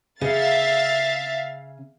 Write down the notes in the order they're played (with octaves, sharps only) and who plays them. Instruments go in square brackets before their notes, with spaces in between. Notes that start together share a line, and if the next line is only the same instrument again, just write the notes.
[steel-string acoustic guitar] C#3 [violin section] E5 F5 A6